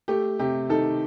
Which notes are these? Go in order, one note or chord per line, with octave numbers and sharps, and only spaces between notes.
A3 G4
C3 G4
D#3 A4